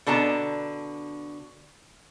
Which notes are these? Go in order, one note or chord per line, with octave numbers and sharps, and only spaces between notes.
B2 D3 A5 A#5